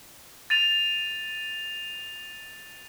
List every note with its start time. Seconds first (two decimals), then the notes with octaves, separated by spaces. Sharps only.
0.50 A6 D#7 F7